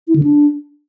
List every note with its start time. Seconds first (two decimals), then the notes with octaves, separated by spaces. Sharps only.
0.08 E4
0.16 D3
0.23 D4